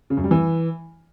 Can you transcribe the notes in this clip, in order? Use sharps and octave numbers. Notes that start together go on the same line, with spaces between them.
C#3
F#2
G3
E3